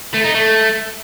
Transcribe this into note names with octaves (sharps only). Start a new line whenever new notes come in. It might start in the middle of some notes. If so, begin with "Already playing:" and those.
A3
D#4
A3